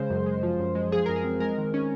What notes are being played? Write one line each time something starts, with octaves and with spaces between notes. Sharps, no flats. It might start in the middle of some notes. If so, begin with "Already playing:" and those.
Already playing: C#3 G#3 C5
F#2
G#3
F3
F#2
G#3
F3 G#4
F#2 A#4
G#4
C4
G#3 A#4
D#3
C#4